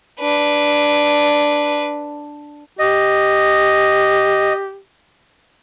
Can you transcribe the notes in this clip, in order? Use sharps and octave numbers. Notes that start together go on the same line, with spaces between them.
D4 B4
G4 D#5